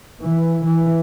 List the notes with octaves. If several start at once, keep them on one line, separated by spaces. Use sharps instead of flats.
E3
E3